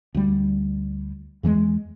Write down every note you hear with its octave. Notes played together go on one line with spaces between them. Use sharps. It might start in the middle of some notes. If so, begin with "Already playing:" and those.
D2 G3
E2 E3 G3 G#3